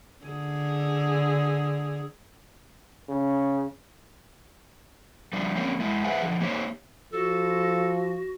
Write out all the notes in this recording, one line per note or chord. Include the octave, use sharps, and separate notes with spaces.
D3 G#4
C#3
F3 G3 D4
F3 A#3 C4 C#4
G#3 E4
G#4 B4 C5 E5 F#5 G#5
D3 F3
A#3 D#4 G4 C5 C#5
F3 F#4 A4